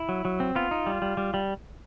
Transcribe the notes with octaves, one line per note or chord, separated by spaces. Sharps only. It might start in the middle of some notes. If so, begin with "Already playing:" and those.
Already playing: E4
F#3
F#3
C4
B3 F4
D#4
G3
G3
G3
G3